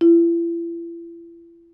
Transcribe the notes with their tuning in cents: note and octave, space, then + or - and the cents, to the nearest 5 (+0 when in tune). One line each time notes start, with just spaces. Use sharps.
E4 +40